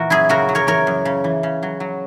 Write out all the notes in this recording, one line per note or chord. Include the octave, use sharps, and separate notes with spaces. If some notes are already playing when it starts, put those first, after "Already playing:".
Already playing: A#2 E3 F#4 A#4
F#2 E4 G#4
C#3 F#4 A#4
F#3
A#4 C#5
E3 A#4 C#5
F#2
C#3
E3
C#3
F#3
F#3